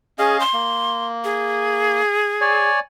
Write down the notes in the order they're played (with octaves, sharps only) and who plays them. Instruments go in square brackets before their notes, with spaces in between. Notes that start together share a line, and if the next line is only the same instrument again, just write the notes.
[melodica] C#4 D#5 F5 [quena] G#4
[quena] C6
[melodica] A#3
[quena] G#4
[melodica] C#5 D5 G#5